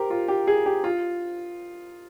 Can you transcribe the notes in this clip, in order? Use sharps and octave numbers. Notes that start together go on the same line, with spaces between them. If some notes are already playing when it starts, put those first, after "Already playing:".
Already playing: G4 A#4 C5
F4
G4
G#4
G4
F4